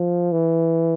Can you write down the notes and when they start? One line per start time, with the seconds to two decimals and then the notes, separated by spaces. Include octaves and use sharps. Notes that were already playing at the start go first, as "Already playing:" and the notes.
Already playing: F3
0.32 E3